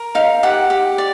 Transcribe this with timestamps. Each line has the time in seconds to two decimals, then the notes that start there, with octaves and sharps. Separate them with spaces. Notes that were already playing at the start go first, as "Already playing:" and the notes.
Already playing: A#4
0.15 D#4 F5
0.43 G4 F#5
0.70 G4
0.98 D5